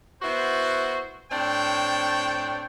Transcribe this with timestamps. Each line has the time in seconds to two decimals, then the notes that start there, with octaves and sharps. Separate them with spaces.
0.22 B3 E4 F#4 C5
1.31 A2 C4 D4 C#5 G5